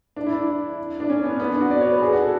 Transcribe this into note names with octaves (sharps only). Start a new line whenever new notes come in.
D4
E4
D4
D4
C#4
B3
B3
D4
F#4
D5
C#5
B4
G#4
F#4
A4